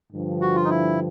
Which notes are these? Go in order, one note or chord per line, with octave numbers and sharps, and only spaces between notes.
G2 D3 F3
F#4
F4
D#4
E4